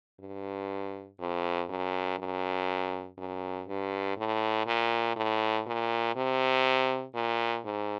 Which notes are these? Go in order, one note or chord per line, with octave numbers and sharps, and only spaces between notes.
G2
F2
F#2
F#2
F#2
G2
A2
A#2
A2
A#2
C3
A#2
G#2